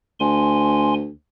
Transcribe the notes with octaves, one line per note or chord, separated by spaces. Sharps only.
D2 G#5 C6